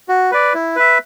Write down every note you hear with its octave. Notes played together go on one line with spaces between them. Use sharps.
F#4
B4 D5
E4
B4 E5